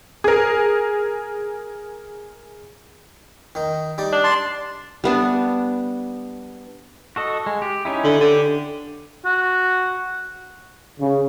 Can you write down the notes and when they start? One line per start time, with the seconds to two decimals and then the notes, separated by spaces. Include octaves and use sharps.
0.24 G#4 A#4
3.55 D#3 D#4
3.98 G3 D#4 D5
4.13 D4
4.24 A5 C6
5.04 G3 B3 D4
7.16 F#4 A4 D#5
7.46 G#3
7.62 G4
7.85 C#4 D#4 E4
8.04 D3
8.21 D3 G4
9.25 F#4
11.00 C#3